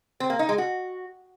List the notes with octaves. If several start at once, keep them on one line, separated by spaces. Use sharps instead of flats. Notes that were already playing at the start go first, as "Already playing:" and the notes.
C4
A#3
D#4
G#3
F#4